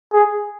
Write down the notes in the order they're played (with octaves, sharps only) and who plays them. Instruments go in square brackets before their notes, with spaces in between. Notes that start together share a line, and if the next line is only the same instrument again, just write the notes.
[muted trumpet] G#4